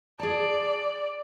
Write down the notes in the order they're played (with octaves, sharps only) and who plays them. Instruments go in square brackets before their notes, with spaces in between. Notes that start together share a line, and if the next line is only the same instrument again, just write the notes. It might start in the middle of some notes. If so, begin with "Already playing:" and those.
[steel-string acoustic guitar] G#4 A5 [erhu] D5